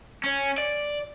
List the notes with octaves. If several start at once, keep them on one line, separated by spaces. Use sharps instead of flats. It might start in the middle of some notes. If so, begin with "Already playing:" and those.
C#4
D5